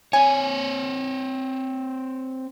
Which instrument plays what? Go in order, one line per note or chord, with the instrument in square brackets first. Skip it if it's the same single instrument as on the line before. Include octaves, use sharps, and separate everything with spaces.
[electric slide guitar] C4 C#5 [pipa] G#5